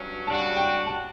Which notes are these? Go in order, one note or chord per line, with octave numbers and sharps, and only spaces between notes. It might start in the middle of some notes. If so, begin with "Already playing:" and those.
Already playing: G2 F#3 C#4
C#3 G3 D4 F#4 A5
G5
A5